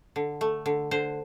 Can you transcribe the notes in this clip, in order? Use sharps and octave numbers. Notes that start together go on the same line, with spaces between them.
D3
A3
D3
D3 C5